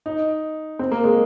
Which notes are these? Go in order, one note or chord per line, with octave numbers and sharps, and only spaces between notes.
D#4
C4
A#3
G#3